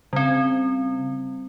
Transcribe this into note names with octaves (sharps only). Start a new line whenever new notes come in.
C#3 G3 C4